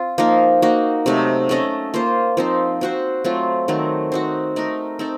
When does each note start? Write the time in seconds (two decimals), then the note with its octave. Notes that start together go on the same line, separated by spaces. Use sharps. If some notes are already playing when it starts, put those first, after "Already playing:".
Already playing: C4 F4
0.18 F3 A#3 D#4 A#4
0.62 A#3 D#4 F#4
1.06 C3 F#3 A3 D#4
1.49 A3 C#4 A4 D#5
1.94 A#3 F4 C5
2.37 F3 C4 D#4
2.81 C4 F#4 C5
3.24 F#3 A3 C4 F4
3.68 D#3 F#3 A3 C4
4.12 C4 D#4 F#4
4.56 A3 D#4 A#4
4.99 C4 D#4 A4